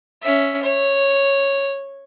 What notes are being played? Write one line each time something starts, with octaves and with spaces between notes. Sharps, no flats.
C#4 E5
C#5